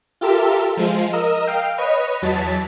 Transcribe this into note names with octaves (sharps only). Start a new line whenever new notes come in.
F4 G4 A4 A#4 E5
F3 G#3 F4
A#4 D#5 D#6 E6
F5 G5
B4 C#5 D#5
E2 F#3 A5 A6 B6